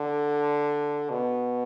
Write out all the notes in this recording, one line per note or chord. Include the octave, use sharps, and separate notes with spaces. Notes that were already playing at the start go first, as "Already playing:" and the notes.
Already playing: D3
B2